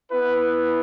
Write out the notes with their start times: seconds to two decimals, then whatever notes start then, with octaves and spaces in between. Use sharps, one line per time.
0.11 B3 E4 B4